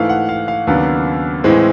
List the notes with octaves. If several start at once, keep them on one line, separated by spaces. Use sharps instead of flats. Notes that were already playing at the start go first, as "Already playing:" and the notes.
Already playing: G#2 E3 A3 F5
F#5
F5
F5
D#2 C#3 F#3 B3 D4
A2 E3 G#3 C4